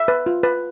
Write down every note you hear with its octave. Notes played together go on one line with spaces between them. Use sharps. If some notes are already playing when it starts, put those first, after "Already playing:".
Already playing: E5
B4
F4
B4